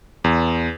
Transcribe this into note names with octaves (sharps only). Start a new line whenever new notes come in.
E2